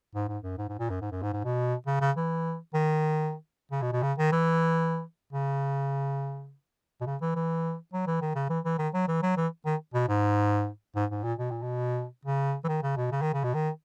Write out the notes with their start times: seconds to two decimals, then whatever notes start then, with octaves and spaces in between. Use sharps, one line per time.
0.15 G#2
0.28 G#2
0.43 F#2
0.58 G#2
0.69 G#2
0.79 A#2
0.90 F#2
1.01 G#2
1.12 F#2
1.22 G#2
1.33 G#2
1.44 B2
1.87 C#3
2.01 C#3
2.17 E3
2.74 D#3
3.72 C#3
3.82 B2
3.93 B2
4.03 C#3
4.18 D#3
4.32 E3
5.33 C#3
7.01 B2
7.06 C#3
7.21 E3
7.36 E3
7.93 F#3
8.07 E3
8.22 D#3
8.35 C#3
8.50 E3
8.65 E3
8.79 D#3
8.94 F#3
9.08 E3
9.23 F#3
9.37 E3
9.66 D#3
9.94 B2
10.08 G#2
10.96 G#2
11.10 G#2
11.24 A#2
11.39 B2
11.51 A#2
11.62 B2
12.25 C#3
12.64 E3
12.68 D#3
12.83 C#3
12.97 B2
13.11 C#3
13.22 D#3
13.33 C#3
13.44 B2
13.54 D#3